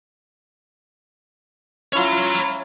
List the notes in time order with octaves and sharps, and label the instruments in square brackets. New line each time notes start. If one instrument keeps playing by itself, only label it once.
[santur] C#4 E4 F4 [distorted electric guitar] C#5 A#5